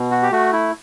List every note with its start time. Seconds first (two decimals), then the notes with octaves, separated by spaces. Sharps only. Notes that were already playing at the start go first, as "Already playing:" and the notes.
Already playing: B2
0.11 F#4
0.23 G4
0.32 A3 F#4
0.53 E4